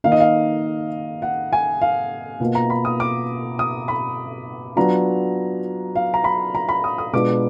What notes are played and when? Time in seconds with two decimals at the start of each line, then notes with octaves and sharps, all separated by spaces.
0.04 D#3 A#3 D#4 F5
0.12 D#5
0.20 F5
1.22 F#5
1.53 G#5
1.81 F5
2.40 B2 A#3 F4
2.55 A#5
2.70 B5
2.85 D#6
3.00 D6
3.59 D#6
3.88 B5
4.76 F#3 B3 D4 F4 A#5
5.96 F5
6.14 A#5
6.24 B5
6.55 A#5
6.69 B5
6.84 D#6
6.98 D#6
7.13 B2 G#3 B3 D4 F4 D6